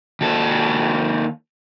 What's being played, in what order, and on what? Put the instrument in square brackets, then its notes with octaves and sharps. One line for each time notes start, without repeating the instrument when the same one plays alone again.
[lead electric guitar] D#2 A4